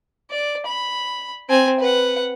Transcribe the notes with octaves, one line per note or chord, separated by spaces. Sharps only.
D5
B5
C4 G#5
B4 F#5